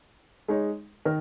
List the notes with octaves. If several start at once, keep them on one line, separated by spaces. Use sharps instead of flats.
G#3 D#4 C#5
D#3 A#4